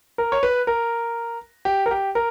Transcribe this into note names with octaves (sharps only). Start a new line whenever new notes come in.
A#4
C#5
B4
A#4
G4
A#4
G4
A#4